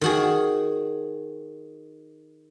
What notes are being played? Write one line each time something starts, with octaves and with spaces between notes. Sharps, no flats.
D#3 F#4 G#4